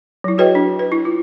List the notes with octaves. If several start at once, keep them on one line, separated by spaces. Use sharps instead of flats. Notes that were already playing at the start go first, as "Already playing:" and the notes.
F#3 E4
F#4 G#4 B4 C#5 D#5 G5
D4
B4
E4
F4